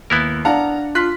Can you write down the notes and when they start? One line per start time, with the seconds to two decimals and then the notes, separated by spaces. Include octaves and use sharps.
0.10 D#2 B3 E4 A#4
0.45 D4 F5 F#5 A5 A#5
0.95 F4 C6 F#6 B6